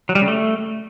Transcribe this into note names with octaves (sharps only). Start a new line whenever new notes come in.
F#3
G3
C#3
A3